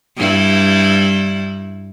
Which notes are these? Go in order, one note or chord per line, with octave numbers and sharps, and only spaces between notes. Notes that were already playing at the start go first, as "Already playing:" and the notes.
G2 G3 E4